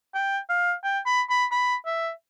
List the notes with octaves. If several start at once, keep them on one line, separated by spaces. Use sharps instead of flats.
G5
F5
G5
B5
B5
B5
E5